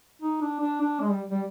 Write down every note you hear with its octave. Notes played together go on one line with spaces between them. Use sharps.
D#4
D4
D4
D4
G#3
G3
G3